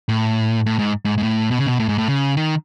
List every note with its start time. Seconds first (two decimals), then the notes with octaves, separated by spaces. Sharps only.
0.09 A2
0.66 A2
0.79 G#2
1.05 G#2
1.18 G#2
1.23 A2
1.51 B2
1.59 C#3
1.66 B2
1.79 A2
1.89 G#2
1.98 A2
2.08 C#3
2.37 D#3